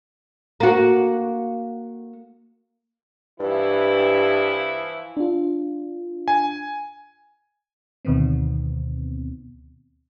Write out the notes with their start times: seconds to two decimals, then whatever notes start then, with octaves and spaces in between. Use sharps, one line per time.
0.60 A#3 F#4
3.40 G2 E3 F3 E4
5.17 D4 F4
6.28 G#5
8.05 D2 B2 D#3 B3 C4